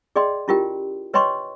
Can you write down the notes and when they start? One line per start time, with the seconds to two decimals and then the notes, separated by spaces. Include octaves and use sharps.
0.16 G#4 D5 D#5 G5 C6
0.48 C#4 E4 F4 G4 A#4 G5
1.14 B4 C#5 D#5 G5 C6 C#6